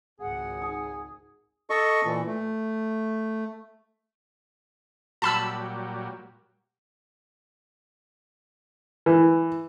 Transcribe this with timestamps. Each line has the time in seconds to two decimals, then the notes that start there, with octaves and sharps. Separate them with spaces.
0.20 G#1 C#2 G#4 F#5
0.62 D#4 D#6
1.70 A4 D#5 C#6
2.05 A#2 E3
2.27 A3
5.22 A#2 F#3 G3 A5 B5 E6
9.06 E3